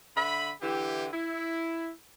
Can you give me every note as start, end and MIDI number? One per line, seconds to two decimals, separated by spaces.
0.17 0.51 50
0.17 0.51 76
0.17 0.51 83
0.62 1.07 50
0.62 1.07 52
0.62 1.07 64
0.62 1.07 67
1.13 1.90 64